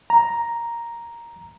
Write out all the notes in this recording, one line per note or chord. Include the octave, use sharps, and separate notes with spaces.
A#5